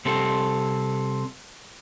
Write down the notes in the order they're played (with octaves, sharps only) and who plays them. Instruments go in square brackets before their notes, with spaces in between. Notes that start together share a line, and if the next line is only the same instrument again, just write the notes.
[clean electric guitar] C3 G3 C4 G4 A4